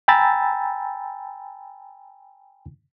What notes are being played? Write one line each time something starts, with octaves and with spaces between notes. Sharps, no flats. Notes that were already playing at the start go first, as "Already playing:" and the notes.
G5 G#5 A#5 B5 E6 A6